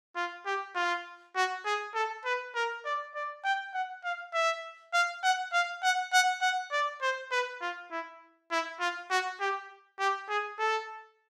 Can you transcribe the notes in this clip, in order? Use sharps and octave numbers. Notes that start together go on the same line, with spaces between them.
F4
G4
F4
F#4
G#4
A4
B4
A#4
D5
D5
G5
F#5
F5
E5
F5
F#5
F5
F#5
F#5
F#5
D5
C5
B4
F4
E4
E4
F4
F#4
G4
G4
G#4
A4